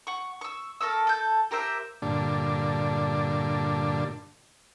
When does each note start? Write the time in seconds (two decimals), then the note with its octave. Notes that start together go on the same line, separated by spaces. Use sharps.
0.07 F#5 C#6
0.41 C#6 E6
0.81 A4 A#4 C#6 E6
1.07 A4 G6
1.51 G4 A#4 C5 E5
2.02 G2 A#2 D3 D4